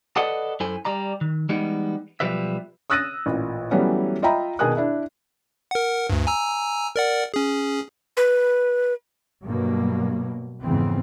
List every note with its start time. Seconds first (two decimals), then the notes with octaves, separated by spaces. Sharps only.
0.16 A4 B4 D5 D#5 F#5 A5
0.60 F#2 E4 A4 C5 G#5
0.85 G3 D5 A#5
1.21 D#3
1.49 E3 G3 G#3 B3 D#4
2.20 B1 F3 G3 B4 E5
2.90 D#6 E6 F#6 A6 A#6 D#7
3.26 A1 A#2
3.71 E3 F#3 G3 A3 B3 C#4
4.22 F4 D#5 E5 G5 A#5 B5
4.59 B2 D#3 G#4 A#4 D#6 F#6
4.77 D4 E4
5.71 A#4 F#5
6.10 D2 G2
6.27 G#5 A#5 E6
6.96 A#4 D5 F#5
7.34 C#4 G#4
8.17 B4
9.45 G2 B2 F#3 A#3
10.63 F2 G#2 C#3 E3 B3 C4